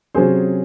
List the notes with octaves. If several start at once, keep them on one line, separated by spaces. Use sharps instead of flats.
C3 F#3 C#4 G#4 C5